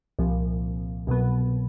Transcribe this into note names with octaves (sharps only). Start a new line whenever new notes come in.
C2 A#2 F3
C2 B2 F#3 B3